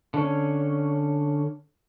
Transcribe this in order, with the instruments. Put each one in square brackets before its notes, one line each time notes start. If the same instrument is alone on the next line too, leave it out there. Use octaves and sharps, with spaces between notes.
[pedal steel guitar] D3 C#4